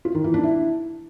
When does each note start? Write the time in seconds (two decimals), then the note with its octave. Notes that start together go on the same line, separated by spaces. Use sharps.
0.05 F4
0.15 D#3
0.24 E3
0.34 D4
0.44 E4